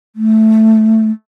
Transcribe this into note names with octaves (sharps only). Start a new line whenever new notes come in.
A3